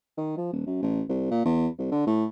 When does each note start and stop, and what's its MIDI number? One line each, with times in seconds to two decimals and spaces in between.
0.17 0.35 51
0.37 0.51 53
0.52 0.63 27
0.66 0.78 42
0.82 1.03 33
1.09 1.28 36
1.31 1.45 46
1.45 1.67 40
1.78 1.90 36
1.91 2.07 50
2.07 2.25 45